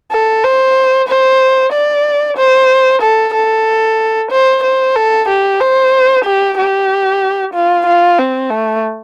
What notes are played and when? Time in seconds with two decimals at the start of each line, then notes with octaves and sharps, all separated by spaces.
0.11 A4
0.44 C5
1.08 C5
1.73 D5
2.37 C5
3.02 A4
3.34 A4
4.31 C5
4.64 C5
4.96 A4
5.28 G4
5.60 C5
6.25 G4
6.57 G4
7.54 F4
7.86 F4
8.19 C4
8.51 A3